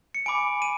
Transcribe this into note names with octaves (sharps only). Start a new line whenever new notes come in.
C#7
G#5 B5 D6 D7
D#7